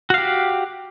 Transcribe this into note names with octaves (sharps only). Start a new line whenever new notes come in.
F#4 G4 F5